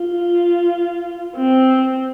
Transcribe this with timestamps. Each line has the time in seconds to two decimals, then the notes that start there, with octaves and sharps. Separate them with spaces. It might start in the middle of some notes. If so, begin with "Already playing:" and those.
Already playing: F4
1.37 C4